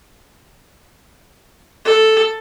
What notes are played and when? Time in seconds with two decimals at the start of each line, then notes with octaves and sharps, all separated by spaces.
1.85 A4